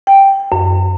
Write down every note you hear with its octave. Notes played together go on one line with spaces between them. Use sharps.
G5
F#2